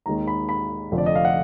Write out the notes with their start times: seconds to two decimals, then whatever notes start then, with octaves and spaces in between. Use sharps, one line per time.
0.06 D#2 D#3 G#3 A#5
0.27 B5
0.49 B5
0.92 F1 F2 D3 F3
0.98 D5
1.06 D#5
1.15 F5
1.25 F#5